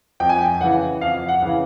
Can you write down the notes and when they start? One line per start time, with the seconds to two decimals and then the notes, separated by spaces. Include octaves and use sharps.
0.20 F2 G5
0.29 G#5
0.38 G5
0.61 C#3 E3 F#5
1.01 F2 F5
1.28 F#5
1.42 C#3 E3